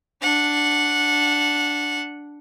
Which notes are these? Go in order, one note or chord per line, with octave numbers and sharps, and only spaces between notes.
D4 F#5